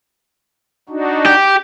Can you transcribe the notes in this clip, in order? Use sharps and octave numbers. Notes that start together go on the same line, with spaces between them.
D4 D#4 F#4
G4